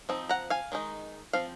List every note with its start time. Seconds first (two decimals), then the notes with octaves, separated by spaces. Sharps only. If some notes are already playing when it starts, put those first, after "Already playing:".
0.09 F3 C4 D#4
0.29 F#5 A#5
0.50 F5 G#5
0.72 D#3 G#3 D#4
1.33 F3 C4 F5